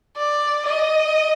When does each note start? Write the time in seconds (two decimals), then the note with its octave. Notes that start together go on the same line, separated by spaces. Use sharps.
0.17 D5
0.66 D#5